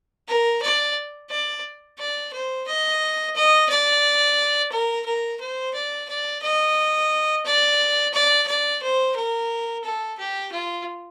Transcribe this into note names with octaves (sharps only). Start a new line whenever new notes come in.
A#4
D5
D5
D5
C5
D#5
D#5
D5
A#4
A#4
C5
D5
D5
D#5
D5
D5
D5
C5
A#4
A4
G4
F4